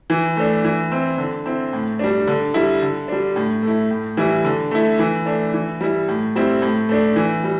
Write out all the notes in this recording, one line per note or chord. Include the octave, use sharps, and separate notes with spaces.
E3
A3 D4
E3
C4 E4
D3
C4 E4
A2
G3 D4
D3
G3 E4
D3
G3 D4
A2
A3 E4
A2
E3 G3 E4
D3
A3 E4
E3
A3 D4
E3
G3 E4
A2
G3 C4 E4
A2
A3 D4
E3
G3